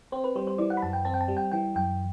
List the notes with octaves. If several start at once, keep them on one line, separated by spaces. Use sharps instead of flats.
C4 C5
B4
G3 C5
C5
E3 D5
F#5
B5
F#2 A5
G5
C4 A5
G5
A5
G3
G5
E3 G5
F#2 G5